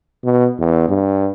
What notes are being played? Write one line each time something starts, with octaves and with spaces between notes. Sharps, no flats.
B2
E2
G2